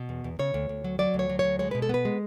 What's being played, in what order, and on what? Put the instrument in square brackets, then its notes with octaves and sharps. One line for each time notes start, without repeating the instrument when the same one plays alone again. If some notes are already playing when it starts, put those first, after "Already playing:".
Already playing: [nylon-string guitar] B2
E2
E2
C#3 C#5
D2
D2
F#3
F#3 D5
D2
C#5
F#3
C#5
D2
G#3 C#5
B2 B4
A4
B3 B4
G#3